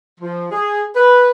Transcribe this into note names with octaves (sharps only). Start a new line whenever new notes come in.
F3
G#4
B4